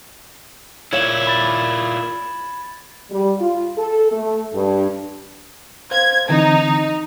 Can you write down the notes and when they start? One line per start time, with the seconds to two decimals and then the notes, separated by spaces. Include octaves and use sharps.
0.93 A#2 E4 C#5 F5 G#6 E7 F#7
1.27 B5 A6
3.11 G3
3.40 F4
3.77 A4
4.12 A3
4.54 G2
5.91 C5 F5 G#6
6.29 D3 E3 C4 D#4